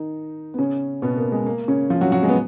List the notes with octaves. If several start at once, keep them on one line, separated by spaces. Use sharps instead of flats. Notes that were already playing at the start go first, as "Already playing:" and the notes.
Already playing: D#3 D#4
B3
C#3 C#4
B2 B3
A#3
G#3
A#3
C#3 C#4
F3 F4
F#3 F#4
F#3 F#4
G#3
B3